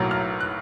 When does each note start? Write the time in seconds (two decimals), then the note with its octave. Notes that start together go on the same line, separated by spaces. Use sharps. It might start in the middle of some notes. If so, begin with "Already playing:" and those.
Already playing: B1 A2 F#3 A#3
0.11 F6
0.40 F#6